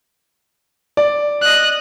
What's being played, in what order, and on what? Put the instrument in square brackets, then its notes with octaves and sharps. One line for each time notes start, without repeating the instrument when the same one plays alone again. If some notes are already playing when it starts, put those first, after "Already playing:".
[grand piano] D5
[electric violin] D#5 F#6